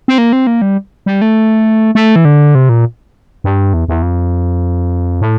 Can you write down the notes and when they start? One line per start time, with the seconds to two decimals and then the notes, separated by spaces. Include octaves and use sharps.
0.08 C4
0.18 A#3
0.33 C4
0.47 A#3
0.62 G3
1.06 G3
1.22 A3
1.95 A3
2.16 E3
2.25 D3
2.55 C3
2.69 A#2
3.44 G2
3.74 E2
3.88 E2
4.02 F2
5.21 A2